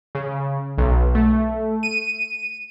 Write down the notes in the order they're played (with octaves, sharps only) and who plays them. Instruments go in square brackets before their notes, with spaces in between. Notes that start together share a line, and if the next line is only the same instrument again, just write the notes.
[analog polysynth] C#3
B1
A3
D#7